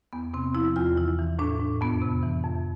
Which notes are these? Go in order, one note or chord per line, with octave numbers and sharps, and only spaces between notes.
E2 B3
C3 C4
F3 E4
E2 F4
E3 E4
E3
A2 D4
A2
F2 B3
C3
E3
F2